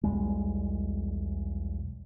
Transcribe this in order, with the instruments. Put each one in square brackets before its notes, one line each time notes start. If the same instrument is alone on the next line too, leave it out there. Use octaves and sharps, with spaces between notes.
[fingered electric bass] B1 E2 G3 G#3